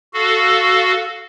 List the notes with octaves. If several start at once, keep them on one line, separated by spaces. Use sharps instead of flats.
F#4 A4 F5